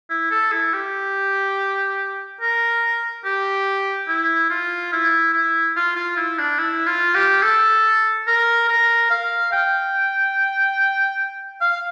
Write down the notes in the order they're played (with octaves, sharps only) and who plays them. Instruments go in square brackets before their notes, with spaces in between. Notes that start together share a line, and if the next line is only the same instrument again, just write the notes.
[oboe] E4
A4
E4
G4
A#4
G4
E4
F4
E4
E4
F4
F4
E4
D4
E4
F4
G4
A4
A#4
A#4
F5
G5
F5